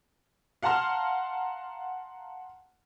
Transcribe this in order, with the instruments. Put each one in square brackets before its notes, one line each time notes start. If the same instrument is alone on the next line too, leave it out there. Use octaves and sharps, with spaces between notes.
[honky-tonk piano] F5 F#5 A5 A#5 C6 F6